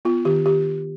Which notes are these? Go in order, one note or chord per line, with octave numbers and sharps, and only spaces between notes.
B3 F4
D#3 G4
D#3 G4